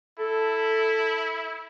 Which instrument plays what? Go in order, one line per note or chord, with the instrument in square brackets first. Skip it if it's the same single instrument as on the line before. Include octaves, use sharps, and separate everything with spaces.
[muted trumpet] E4 [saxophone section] A4